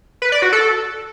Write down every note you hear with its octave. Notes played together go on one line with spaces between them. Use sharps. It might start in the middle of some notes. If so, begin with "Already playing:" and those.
B4
D5
F#4
A4